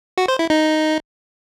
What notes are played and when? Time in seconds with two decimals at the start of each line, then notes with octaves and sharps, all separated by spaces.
0.18 F#4
0.28 C5
0.39 E4
0.50 D#4